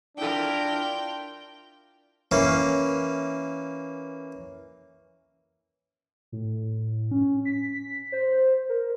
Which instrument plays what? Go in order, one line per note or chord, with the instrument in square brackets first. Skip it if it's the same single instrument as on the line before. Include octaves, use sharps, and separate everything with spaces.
[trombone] D4 [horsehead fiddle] E4 A#4 [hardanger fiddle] F4 G5
[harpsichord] E3 A#3 C#4
[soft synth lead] A2
C#4
B6
C5
A#4